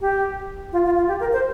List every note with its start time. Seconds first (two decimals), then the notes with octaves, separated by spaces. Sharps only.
0.01 G4
0.73 F4
0.85 F4
0.96 F4
1.08 G4
1.20 A#4
1.33 C5